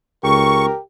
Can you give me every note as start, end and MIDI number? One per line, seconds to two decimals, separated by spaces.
0.24 0.68 37
0.24 0.79 67
0.24 0.79 70
0.24 0.66 85